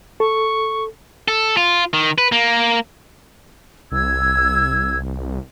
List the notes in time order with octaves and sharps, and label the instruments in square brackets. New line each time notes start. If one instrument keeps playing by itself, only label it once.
[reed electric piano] A4 [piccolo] C#6
[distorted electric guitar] A4
F4
D#3
B4
A#3
[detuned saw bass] C2 [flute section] E6 G#6